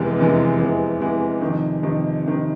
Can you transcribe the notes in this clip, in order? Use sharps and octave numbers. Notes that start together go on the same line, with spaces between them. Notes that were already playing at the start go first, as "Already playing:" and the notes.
Already playing: F1 E2 C3 E3 G#3
F1 E2 C3 E3 G#3
F1 E2 C3 E3 G#3
F1 E2 C3 E3 G#3
F2 C3 D#3
F2 C3 D#3
F2 C3 D#3